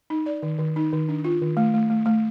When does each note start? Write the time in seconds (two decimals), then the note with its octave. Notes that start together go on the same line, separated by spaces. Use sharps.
0.10 D#4
0.26 D5
0.43 D#3
0.59 D#3
0.76 D#4
0.92 D#3
1.09 D4
1.25 F4
1.41 D#3
1.57 A3
1.74 A3
1.90 A3
2.06 A3